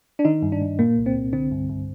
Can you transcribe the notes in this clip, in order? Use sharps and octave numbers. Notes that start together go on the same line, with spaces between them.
D4
D#3 D#4
G2
D4
G2
A#2 A#3
C2
C4
C2
D3 C4
G2
G2